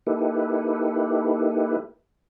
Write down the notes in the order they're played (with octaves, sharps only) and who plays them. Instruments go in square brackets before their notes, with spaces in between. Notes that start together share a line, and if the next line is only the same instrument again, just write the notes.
[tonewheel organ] A#3 D#4 E4 G4 A4 B4